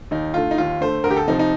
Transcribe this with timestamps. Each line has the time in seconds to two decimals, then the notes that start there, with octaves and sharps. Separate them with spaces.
0.11 D#2 D#4
0.34 D3 A3 F4
0.51 D#4
0.58 D#2 F4
0.81 D3 A3 C5
1.04 D2 A#4
1.11 G4
1.17 A4
1.27 C3 F3 D#4
1.39 D#4